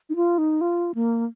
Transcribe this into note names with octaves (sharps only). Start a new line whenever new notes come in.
D#4
F4
D#4
F4
A#3